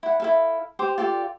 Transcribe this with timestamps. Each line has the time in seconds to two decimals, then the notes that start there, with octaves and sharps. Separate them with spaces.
0.03 E4 F#5
0.20 E4 A4 F5
0.79 G4 C5 D6
0.98 F4 G4 A4 D5